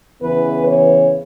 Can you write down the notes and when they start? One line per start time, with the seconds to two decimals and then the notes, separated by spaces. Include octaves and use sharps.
0.21 E2 C#3 E3 B3 B4
0.67 C#5